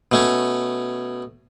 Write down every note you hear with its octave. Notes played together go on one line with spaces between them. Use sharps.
B2 A3 C#4